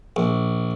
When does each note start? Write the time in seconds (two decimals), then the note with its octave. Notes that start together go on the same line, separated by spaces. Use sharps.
0.16 A#1